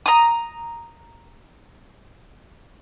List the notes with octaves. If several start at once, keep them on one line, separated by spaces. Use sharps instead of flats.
A#5 D#6